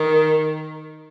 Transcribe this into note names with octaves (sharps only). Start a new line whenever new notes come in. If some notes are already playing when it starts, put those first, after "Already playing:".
Already playing: D#3